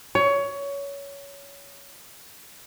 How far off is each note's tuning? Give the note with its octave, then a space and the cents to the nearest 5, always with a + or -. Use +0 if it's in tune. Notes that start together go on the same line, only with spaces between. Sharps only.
C#5 +20